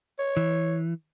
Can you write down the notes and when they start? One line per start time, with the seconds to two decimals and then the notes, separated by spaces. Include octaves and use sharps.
0.19 C#5
0.37 E3